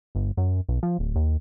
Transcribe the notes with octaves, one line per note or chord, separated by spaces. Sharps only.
G1
F#2
B1
F3
D1
D#2